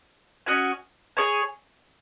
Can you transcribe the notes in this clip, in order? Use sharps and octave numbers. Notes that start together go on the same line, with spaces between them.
C#4 F#4 D#5 G#5
G#4 C#5 G#5